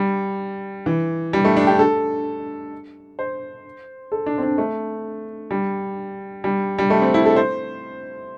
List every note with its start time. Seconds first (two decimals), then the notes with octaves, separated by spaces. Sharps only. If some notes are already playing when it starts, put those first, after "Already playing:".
Already playing: G3
0.86 E3
1.33 G3
1.45 A3
1.57 D4
1.67 G4
1.79 A4
3.19 C5
4.12 A4
4.26 D4
4.38 C4
4.43 D4
4.58 A3
5.51 G3
6.44 G3
6.79 G3
6.90 A3
7.02 C4
7.14 E4
7.26 A4
7.36 C5